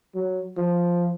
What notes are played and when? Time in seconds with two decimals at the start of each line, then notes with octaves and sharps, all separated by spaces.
0.15 F#3
0.57 F3